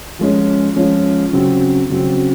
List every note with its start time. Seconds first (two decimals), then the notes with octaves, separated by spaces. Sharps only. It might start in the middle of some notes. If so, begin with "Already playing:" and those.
0.19 F3 G#3 C#4
0.76 F3 G#3 C#4
1.33 C#3 F#3 C4
1.90 C#3 F#3 C4